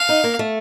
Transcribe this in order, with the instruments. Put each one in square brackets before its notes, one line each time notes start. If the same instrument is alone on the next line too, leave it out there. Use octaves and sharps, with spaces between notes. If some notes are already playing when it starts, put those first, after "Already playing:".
Already playing: [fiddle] F5
[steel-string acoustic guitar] D#4
A#3
A3